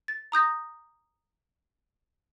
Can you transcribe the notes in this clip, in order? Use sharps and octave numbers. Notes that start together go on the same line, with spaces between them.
A6
A#5 D#6 G6 A#6